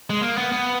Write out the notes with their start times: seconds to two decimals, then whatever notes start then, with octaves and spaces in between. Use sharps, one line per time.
0.10 G#3
0.22 A#3
0.38 B3
0.52 B3